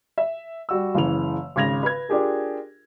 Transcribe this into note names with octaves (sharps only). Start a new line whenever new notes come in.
E5
G3 F#4 E6
F#1 C#3 E3 F7
G#1 C#3 G#6 A#6 F7
B4 G#6
D4 F4 G4 G#4 A#4